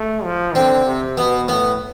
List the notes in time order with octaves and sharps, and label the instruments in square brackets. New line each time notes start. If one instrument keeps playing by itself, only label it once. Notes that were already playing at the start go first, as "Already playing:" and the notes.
Already playing: [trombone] A3
F3
[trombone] D3 [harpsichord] C4
[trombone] C3
[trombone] B2 [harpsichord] B3
[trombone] A2 [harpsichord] B3